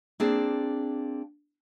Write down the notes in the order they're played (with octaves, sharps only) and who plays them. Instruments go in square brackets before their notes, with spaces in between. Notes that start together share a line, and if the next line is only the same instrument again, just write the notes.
[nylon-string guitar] A#3 C4 D4 G#4